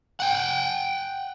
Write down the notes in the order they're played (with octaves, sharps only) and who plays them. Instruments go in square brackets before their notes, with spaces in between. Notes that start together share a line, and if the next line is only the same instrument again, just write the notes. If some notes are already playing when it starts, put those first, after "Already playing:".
[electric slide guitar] F#5 G5